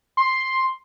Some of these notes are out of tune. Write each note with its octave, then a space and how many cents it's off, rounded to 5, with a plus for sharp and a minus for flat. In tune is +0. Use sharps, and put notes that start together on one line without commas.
C6 +5